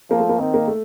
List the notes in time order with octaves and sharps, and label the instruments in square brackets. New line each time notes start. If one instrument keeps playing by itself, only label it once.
[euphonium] F3 [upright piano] A#3
[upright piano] A3
A#3
[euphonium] D#3 [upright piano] C4
[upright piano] A#3
A3